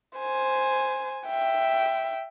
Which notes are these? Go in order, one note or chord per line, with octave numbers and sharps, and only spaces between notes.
C5 G#5
E5 G5